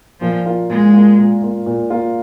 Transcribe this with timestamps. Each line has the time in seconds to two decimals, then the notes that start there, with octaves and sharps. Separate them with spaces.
0.21 A#2 F3
0.45 A#3 F4
0.69 A#2 G#3
0.93 A#3 F4
1.18 A#2
1.42 A#3 F4
1.66 A#2
1.90 A#3 F4